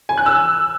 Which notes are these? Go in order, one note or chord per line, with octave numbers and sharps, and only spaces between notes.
G#5
F#6
E6